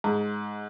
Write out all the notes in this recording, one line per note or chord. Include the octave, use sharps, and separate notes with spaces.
G#2